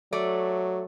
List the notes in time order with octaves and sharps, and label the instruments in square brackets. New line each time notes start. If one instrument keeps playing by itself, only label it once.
[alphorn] F#3 [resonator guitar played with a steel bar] A3 D5